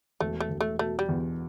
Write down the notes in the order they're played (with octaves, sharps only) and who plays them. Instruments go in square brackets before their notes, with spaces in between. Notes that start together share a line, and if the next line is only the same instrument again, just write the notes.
[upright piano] E1 [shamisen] A3
[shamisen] A3
[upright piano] E1
[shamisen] A3
[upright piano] B2 [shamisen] A3
[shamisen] G3
[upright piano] E2